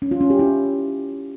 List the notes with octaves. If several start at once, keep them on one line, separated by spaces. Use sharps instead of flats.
C#4
F4
C#4
G4
E4